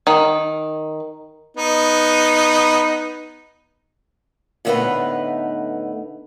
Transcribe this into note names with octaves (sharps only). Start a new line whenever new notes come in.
D#3
B3 D#4
A2 D3 A3 B3 D#4 B4